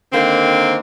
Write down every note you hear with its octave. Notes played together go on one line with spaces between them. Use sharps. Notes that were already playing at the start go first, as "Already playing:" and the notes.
D3 D#3 A#3 C4